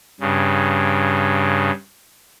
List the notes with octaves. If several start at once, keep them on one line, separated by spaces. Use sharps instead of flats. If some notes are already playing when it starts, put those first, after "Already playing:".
G2 C#3